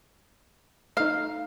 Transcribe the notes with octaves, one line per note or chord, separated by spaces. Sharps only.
A3 D#4 F5